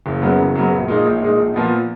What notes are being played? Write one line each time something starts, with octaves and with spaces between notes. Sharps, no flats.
F#1
F#2 C#3 F#3 B3
F#1
F#2 C#3 F#3 B3
A#1
A#2 G#3 D#4 G#4
A#1
A#2 G#3 D#4 G#4
A#1
A#2 F3 B3